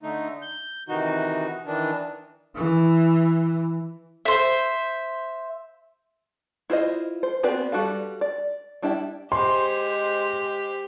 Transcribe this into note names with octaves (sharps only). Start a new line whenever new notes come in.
D3 A3 D#4
G6
C3 D#3 E3 D#4 F#4
D#3 E3 D4
E3
C5 E5
E4 F4 C5 D#5
C5
B3 C4 F#4 B4 D5
G3 F#4 A4 B4 F5
D5
G3 D4 E4 D5 G5
G#3 G4 C5 C6